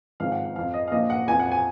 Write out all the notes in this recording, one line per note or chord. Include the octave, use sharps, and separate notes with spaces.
G#1 G#2 F3 F5
F#5
F#5
F2 F3 F5
D#5
F5
A#1 A#2 F3 D#5
F#5
F2 F3 G#5
F#5
G#5